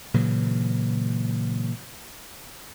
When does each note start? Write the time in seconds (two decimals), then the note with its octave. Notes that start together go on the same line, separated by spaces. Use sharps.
0.14 A#2 C#3 E3 F#3